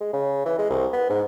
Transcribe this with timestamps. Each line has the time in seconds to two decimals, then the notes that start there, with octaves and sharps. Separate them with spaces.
0.01 G#3
0.13 C#3
0.45 E3
0.58 G#3
0.70 C2
0.93 B3
1.10 G#2